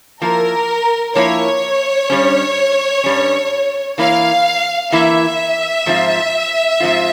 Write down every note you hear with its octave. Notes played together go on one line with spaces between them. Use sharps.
F3 A#3 E4 A#4
F3 A#3 E4 C#5
G2 G3 C#4
G2 G3 C#4
E3 A#3 E4 F5
E3 A#3 E4 E5
G#2 F3 C4 F4
G#2 F3 C4 F4